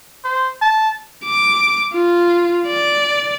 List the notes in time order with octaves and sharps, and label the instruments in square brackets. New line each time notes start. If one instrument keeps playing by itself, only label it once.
[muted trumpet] C5
A5
[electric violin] D6
F4
D5